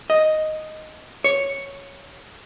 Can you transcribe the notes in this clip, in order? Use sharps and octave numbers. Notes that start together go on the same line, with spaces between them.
D#5
C#5